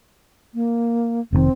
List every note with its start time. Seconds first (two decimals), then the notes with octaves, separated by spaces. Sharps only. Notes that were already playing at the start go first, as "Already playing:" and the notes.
0.54 A#3
1.32 F1 A2 D#3 C4